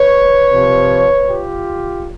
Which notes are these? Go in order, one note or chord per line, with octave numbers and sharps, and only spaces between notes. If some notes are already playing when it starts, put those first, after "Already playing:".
Already playing: B4 C#5
C3 F3
F4 G4